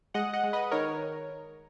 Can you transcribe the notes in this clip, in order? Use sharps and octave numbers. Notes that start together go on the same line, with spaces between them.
G#3 D#5 F#5
D#5 F#5
G#3
B4 D#5
D#3 A#4 C#5